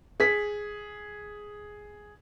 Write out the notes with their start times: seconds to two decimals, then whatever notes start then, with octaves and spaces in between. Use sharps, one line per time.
0.20 G#4 B6